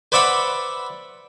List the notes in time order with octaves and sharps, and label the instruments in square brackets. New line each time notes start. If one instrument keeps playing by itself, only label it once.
[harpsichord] B4 C5 D5 E5 F#5 B5